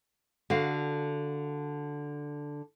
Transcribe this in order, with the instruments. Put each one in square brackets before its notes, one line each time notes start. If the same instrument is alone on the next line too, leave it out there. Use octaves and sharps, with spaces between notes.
[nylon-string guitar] D3 F#4 F5